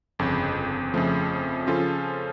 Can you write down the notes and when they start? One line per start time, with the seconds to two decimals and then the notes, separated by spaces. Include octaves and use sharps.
0.19 G1 F2 C#3
0.94 F2 C#3 F3 A3
1.67 C#3 F3 C#4 F4 A4